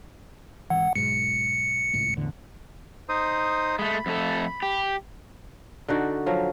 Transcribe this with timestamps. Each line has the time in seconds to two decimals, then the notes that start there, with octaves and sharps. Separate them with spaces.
0.70 G#1 E3 F#5
0.95 B1 G#2 C#7
1.93 G#1 C#2 A2
2.17 E2 A2 D3
3.09 D#4 C5 D#6
3.79 G#3 A3 B5
4.06 F2 A3 A4
4.62 G4
5.88 D3 D#4 F#4 D5
6.26 F3 F#3 A#4